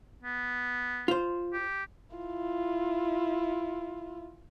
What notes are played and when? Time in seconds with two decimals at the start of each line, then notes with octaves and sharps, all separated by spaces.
0.23 B3
1.08 F4 C5
1.53 G4
2.16 E4 F4